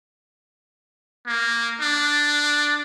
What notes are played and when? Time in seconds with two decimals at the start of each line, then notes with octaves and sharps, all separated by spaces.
1.26 A#3
1.80 D4